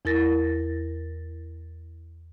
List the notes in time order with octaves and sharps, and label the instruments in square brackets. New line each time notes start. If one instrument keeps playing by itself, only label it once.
[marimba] E2 E4 A#4 A6 A#6